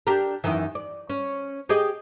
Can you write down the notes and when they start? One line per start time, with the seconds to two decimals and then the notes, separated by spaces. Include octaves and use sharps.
0.07 D4 G4 A#4
0.44 F#2 D#3 E3
0.75 D5
1.10 C#4
1.69 G4 G#4 D#5